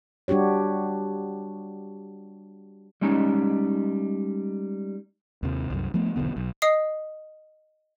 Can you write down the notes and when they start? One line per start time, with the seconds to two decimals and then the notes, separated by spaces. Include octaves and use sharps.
0.28 G3 D4 F#4 G4 C#5
3.01 G3 G#3 C#4 D#4
5.43 D#2 C3
5.70 C2 F#2
5.94 F3 A3 B3
6.16 E1 B1 D3 B3
6.36 B1
6.62 D#5 D#6 C7